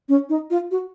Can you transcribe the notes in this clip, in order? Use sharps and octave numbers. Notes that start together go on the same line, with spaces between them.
C#4
D#4
F4
F#4